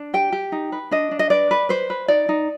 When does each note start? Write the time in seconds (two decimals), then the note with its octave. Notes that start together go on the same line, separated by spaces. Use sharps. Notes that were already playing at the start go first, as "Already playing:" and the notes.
Already playing: D4
0.14 G4 G5
0.32 G4
0.52 D#4
0.72 B4
0.91 D4 D#5
1.11 D4
1.19 D#5
1.30 B4 D5
1.51 B4
1.69 B4 C5
1.90 B4
2.08 D#4 D5
2.29 D#4